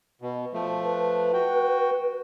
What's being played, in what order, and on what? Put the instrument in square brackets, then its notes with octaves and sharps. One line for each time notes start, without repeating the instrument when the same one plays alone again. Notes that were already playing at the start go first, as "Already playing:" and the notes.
[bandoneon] B2
F3 A3
[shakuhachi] B4
[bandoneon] F#4 G5